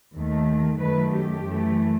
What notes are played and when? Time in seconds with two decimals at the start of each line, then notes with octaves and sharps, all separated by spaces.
0.15 D#2 D#3 A3
0.80 F#2 D#3 F#3 A3 B4
1.12 G4
1.44 F#2 E3 A3